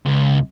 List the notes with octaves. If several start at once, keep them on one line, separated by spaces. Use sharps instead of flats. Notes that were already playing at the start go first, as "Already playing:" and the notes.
C#2